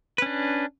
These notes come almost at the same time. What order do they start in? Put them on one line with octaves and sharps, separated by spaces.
B4 C#4 D4